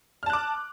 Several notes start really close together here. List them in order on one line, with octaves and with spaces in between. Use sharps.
F6 A5 F#6 D6